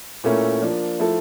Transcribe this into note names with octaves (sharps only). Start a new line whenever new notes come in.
A#2 A3 C#4 E4 A#4
F3 A#3 D4
F3 A3 E4 A4